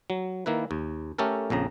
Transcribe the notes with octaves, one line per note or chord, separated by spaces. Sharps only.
F#3
D#3 A#3 E4 B4
D#2
A3 C#4 G4 A4 A#4
A#1 F2 C#3 A#5